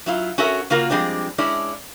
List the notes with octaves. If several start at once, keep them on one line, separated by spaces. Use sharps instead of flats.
F#3 E4 F4
C#4 F#4 A4 A#4 E5
C#3 A#3 F4 F#4 A#4
F3 G3 G#3 C4 D4
G#3 C#4 D4 E4 D5